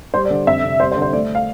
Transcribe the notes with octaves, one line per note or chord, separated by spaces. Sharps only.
G3 C5
D5
D3
F2 E5
C3
G3 C5
C5
D3
C5
A3 D5
F5